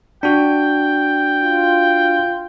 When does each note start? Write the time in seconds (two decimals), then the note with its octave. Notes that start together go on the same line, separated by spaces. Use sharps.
0.23 D4 F#4 G5
1.42 F4